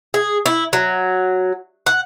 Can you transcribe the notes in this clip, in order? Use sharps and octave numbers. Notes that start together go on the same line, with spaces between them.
G#4
E4
F#3
F#5